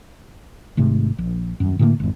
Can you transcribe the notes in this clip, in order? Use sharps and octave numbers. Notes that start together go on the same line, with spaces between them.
G#1 G#2 C3 A3
A#1
D#1 F#2
A2 D3 D#3 A#3
G#1 F2